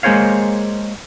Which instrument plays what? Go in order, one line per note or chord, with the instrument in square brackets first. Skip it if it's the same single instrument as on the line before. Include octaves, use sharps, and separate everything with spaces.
[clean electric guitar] G#3 A#3 G#4 C5 C#5 F5